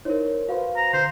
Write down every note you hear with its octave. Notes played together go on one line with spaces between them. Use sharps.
D#4 E4 A#4 C5 C#5
F#4 B4 C5 F5
A#5
D3 C5